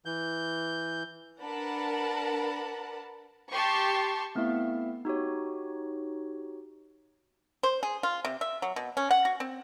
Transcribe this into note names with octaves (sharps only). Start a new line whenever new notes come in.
E3 G6
D4 A#4 B4 F#5 A5 B5
G4 A5 C6 C#6
A3 B3 C4 E4 E5 F5
D#4 F#4 G4 C#5
C5
G#4
F4
C3
E5
F#3
B2
C#4
F#5
F#4
C4